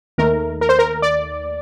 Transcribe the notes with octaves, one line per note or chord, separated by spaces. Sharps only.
D#2 D#3 A3 A#4
A#4
C5
A#4
D5